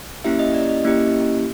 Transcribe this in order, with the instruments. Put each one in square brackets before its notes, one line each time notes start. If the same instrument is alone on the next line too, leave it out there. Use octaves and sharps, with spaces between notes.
[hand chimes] A#3 C#4 E4 G4 E5
D#5
D5
D#5
A#3 C#4 E4 G4